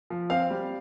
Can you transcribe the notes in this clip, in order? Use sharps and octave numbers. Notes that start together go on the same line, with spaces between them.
F3
C4 F5
G3